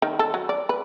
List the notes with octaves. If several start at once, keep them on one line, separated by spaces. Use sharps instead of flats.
D#3
A4
F#3
D5
B4